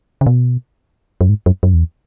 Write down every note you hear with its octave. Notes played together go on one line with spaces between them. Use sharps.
C#3
B2
F#2
G#2
F#2
F#2
E2